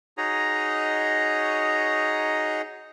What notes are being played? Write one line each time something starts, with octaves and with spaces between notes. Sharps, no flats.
D#4 F#4 G#4 C#5 D#5 A#5